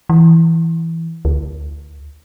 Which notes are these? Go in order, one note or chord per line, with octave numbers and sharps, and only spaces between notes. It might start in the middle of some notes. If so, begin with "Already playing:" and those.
E3
D2